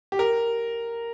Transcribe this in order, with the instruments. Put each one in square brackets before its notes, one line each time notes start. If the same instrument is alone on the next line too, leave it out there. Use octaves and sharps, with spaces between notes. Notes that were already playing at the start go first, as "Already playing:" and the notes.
[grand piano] G4
A#4